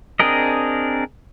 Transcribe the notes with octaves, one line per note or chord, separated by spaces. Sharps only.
C4 D4 G#4 A#4 D#5